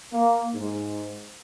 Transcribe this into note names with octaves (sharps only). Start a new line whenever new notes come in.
A#3
G#2